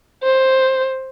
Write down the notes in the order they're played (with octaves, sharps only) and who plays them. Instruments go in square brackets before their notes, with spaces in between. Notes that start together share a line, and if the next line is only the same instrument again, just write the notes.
[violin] C5